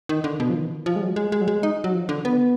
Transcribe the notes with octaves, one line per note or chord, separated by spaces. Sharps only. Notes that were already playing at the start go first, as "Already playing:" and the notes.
D#3
D3
B2
F3
D#3
F3
G#3
F#3
G#3
G#3
F#3
G#3
D#4
F#3
F3
D3
B3